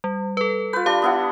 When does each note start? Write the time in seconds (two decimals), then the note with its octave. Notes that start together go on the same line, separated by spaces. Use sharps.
0.04 G3
0.37 A4 B4
0.73 F4 B4 G6
0.86 D4 G4 F5
1.02 B3 E4 F#5